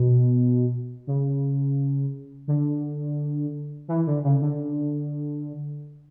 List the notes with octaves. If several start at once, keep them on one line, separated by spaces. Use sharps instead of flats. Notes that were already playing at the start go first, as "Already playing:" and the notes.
Already playing: B2
C#3
D3
E3
D3
C#3
D3